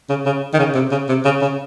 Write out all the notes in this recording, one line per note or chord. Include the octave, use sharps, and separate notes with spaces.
C#3
C#3
D#3
C#3
C3
C#3
C3
C#3
C#3